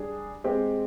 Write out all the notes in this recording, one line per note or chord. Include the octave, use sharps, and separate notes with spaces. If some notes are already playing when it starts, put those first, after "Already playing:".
Already playing: G3 D4 G#4
G#3 C4 G4